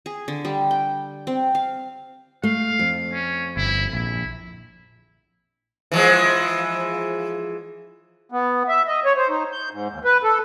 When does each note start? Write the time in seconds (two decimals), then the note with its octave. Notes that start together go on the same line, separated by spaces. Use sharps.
0.06 G#4
0.28 D3
0.45 G3
0.71 G5
1.27 C4
1.55 F5
2.43 A3 F5
2.79 F2
3.13 C#4
3.57 G1 E4
3.93 A#1 E4
5.92 E3 F3 G#3
8.32 B3
8.68 E5
8.87 D#5
9.05 C#5
9.16 C5
9.29 D#4
9.52 G6
9.71 G#2
9.90 D#2
10.05 B4
10.23 A4